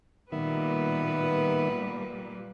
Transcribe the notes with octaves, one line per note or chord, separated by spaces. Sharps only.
A#2 D#3 G3 B3 B4 E5